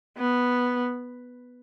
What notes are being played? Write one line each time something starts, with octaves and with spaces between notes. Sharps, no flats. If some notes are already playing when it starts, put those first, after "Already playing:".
B3